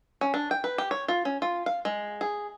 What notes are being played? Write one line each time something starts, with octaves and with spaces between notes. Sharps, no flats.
C#4
D4
G5
B4
G4
C#5
F4
C#4
F4
F5
G#3
G#4